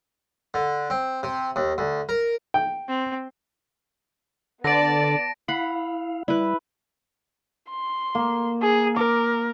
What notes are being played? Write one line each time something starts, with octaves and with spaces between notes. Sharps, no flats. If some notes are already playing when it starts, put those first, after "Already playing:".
D3
C4
C3
D#2
D2
A#4
G5
C4
D3 B3 D5 A5 A#6 D7
E4 F5 F#5 B5
G3 E4 B4
C6
A#3
G#4
A#4 D6